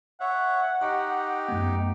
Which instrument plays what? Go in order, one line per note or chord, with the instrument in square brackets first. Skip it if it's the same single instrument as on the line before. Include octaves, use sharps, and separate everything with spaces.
[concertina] C#5 E5 [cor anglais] F#5
[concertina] D#4 G4 [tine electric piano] C#6
[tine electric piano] F#2 A3 B3